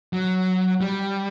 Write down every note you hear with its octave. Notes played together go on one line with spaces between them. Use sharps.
F#3
G3